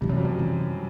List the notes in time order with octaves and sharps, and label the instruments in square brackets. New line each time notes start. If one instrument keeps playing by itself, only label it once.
[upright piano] G2 [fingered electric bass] C3 E3 G3
[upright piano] F#2
F2
F#2
[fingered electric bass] C3 E3 G3